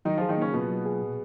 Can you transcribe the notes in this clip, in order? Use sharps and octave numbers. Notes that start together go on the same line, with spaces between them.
D#3 F#3 D#4
F3 F4 G#4
D#3 D#4
C#3 A#3 C#4
B2 B3 F4
F#3
G#4
A#2